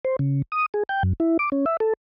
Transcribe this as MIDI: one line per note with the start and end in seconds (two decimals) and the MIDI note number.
0.05 0.16 72
0.19 0.42 49
0.52 0.66 87
0.74 0.83 68
0.89 1.03 79
1.03 1.13 42
1.20 1.37 64
1.39 1.50 86
1.52 1.65 61
1.66 1.77 76
1.80 1.93 69